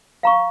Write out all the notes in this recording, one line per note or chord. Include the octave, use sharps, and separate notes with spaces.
F5 A#5 C#6